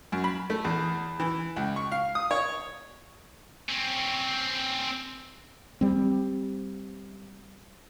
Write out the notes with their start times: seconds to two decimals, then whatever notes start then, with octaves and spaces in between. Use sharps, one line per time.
0.12 F#2
0.24 B5
0.50 A3
0.65 E2
1.20 E3
1.56 C#2
1.76 C#6
1.92 F5
2.15 D#6
2.31 C#5
3.69 C4 C#4
5.81 G3 C4